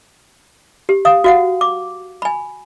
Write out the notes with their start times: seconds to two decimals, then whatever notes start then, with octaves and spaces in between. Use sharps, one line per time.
0.89 G4
1.05 F5 D#6
1.24 F#4 F5 F#5
1.61 D6
2.22 G#5 B5